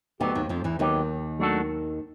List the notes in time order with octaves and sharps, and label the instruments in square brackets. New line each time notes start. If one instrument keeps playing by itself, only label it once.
[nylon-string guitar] D2 D3 [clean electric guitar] F#3 B3 D#4 G4
[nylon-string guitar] D#2 D#3
F2 F3
E2 E3
[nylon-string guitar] D#2 D#3 [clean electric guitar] F#3 B3 D#4 G4
[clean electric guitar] F#3 A3 D4 F#4 A4